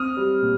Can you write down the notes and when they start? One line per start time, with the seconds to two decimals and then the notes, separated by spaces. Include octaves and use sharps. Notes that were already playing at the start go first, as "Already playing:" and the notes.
Already playing: C4 D#6 F6
0.17 G3
0.42 A#2